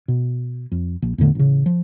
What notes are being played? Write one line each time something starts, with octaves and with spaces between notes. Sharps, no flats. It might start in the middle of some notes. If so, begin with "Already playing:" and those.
B2
F2
A#1
E2 A2 D3 A3
A1 C#3
F3